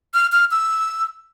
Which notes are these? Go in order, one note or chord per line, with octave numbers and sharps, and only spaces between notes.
F6
F6
E6